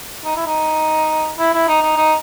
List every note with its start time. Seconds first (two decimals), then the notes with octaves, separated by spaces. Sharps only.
0.25 D#4
0.36 E4
0.46 D#4
1.39 E4
1.54 E4
1.68 D#4
1.82 D#4
1.97 D#4